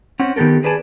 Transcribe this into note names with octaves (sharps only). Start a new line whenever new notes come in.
C4 C#4 F#5
D#3 B3 G4 A4 A#4
G#4 B4 D5 G#5 A5